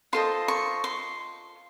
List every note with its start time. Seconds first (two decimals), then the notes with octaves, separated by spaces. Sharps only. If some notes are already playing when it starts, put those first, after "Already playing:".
0.13 F4 A4 C5 D#5 C6
0.48 C#6
0.84 C6